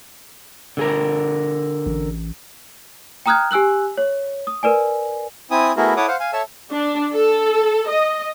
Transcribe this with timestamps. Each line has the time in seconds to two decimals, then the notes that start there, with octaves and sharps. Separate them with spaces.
0.77 D3 G#4 A#4
1.86 A1
3.26 G5 A#5 D#6 F6 F#6 G#6
3.51 G4 G#5 E6 F#6 F#7
3.98 C#5
4.47 D#6
4.63 A#4 B4 D5 G#5
5.51 C4 E4 G#5 D#6
5.77 A3 B3 E4 F#4 G#4 A#4
5.97 E4 A4 C#5 F#5 D6 D#6
6.08 C5 F5 F#5
6.20 F5 G#5
6.33 A4 C#5 E5 A5 E6
6.72 D4
7.15 A4
7.90 D#5